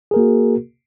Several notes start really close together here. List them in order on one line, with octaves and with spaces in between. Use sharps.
G#4 A#4 A#3 F#4